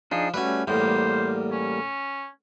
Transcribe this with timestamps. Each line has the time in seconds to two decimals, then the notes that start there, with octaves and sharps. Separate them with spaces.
0.12 F3 D4 D#4 G#4
0.34 G3 A3 C#4 F#4 B4
0.68 E2 A2 G3 A#3 C5
1.52 C#4